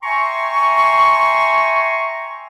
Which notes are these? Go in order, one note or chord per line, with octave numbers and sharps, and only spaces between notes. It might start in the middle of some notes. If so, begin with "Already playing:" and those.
E5 G5 G#5 A#5 C6 C#6